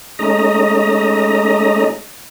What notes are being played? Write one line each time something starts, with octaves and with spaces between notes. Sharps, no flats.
G#3 A3 C#4 D#4 D#5 A#5